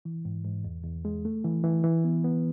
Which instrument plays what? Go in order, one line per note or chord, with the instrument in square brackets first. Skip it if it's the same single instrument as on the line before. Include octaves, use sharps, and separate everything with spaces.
[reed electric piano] E3
G#2
G#2
E2
E2
G#3
A3
E3
E3
E3
B3
B3